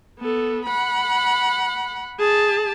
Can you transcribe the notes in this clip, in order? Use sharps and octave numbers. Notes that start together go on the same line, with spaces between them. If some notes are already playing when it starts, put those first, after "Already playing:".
B3 A4
F#5 B5
G#4 A5